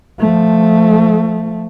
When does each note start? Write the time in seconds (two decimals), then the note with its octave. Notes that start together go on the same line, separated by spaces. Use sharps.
0.20 F3 A3